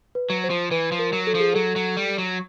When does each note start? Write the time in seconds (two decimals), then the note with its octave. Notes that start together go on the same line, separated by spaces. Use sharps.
0.15 B4
0.30 F#3
0.44 C5
0.50 F3
0.71 E3 B4
0.92 F3
0.99 A#4
1.13 F#3
1.27 A4
1.35 F3
1.40 G#4
1.53 F#3 A4
1.76 F#3
1.97 G3
2.18 F#3